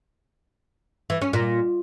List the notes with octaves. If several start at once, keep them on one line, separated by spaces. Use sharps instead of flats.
E3
C#4
A#2